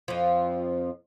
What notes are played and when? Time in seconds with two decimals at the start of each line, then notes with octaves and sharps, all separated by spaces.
0.08 F2 F3